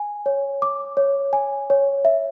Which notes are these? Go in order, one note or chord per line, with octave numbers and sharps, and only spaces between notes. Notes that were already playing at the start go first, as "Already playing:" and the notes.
Already playing: G#5
C#5
D6
C#5
G#5
C#5
E5